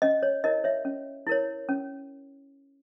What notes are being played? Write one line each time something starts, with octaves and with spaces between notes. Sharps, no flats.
C#4 D#5
C#5
E4 A#4 C#5 D#5
C#5 E5
C#4
E4 A#4 C#5
C#4